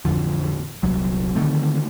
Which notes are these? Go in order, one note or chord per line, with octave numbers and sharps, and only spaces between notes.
A1 F2 D3 F3
D#1 C2 F#3
D3 D#3 A3 C4